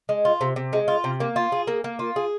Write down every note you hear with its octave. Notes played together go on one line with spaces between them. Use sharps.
G#3
F4
C3
C3
G#3
F4
C3
A#3
F4
G#4
A#3
A#3
F4
G#4